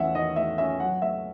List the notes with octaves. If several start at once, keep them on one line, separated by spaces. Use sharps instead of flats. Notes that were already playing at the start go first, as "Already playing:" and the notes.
Already playing: E2 A3 C#4 E5 F#5
D#3 D#5
A3 E5
C#4 E5
F#3 F#5
A3 E5